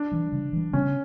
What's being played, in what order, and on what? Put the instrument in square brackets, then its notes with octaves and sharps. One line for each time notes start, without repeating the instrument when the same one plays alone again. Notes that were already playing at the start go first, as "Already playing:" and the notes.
Already playing: [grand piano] D4
[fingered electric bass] E3 G3
C#3
E3 G3
[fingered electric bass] C#3 [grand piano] C#4